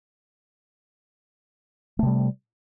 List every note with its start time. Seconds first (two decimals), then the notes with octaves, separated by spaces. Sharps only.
1.99 A3
2.03 C3
2.06 G3